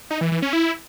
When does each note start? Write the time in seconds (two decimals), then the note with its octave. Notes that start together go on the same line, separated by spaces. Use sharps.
0.11 D#4
0.21 E3
0.32 E3
0.42 C#4
0.53 E4